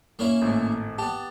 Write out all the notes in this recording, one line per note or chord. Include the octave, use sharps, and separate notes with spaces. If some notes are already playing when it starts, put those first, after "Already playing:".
A#3 C#4 E4
G#1 A2 A3
B3 G4 A5